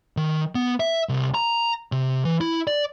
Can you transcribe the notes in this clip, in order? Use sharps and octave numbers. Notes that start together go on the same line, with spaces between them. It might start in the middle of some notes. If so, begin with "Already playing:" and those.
D#3
B3
E5
C2
A#5
C3
E3
E4
D5